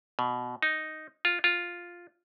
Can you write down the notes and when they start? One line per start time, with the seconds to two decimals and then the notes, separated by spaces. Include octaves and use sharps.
0.19 B2
0.63 D#4
1.25 F4
1.44 F4